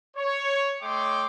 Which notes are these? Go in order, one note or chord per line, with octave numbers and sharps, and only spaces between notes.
C#5
A3 C#5 D#5 G5 C6 D6